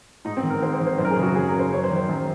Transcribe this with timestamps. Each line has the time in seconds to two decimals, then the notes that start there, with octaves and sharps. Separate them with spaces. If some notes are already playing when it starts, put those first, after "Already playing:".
0.25 G#2 D#4
0.37 C4
0.43 D#3
0.50 A#4
0.62 G#2 C5
0.74 C5
0.81 D#3
0.87 C5
0.98 F#2 C5
1.05 A#4
1.11 G#4
1.16 C#3
1.23 F#4
1.35 F#2 G#4
1.48 A#4
1.54 C#3
1.59 C5
1.73 F#2 C#5
1.84 C5
1.91 D#3
1.96 C5
2.09 F#2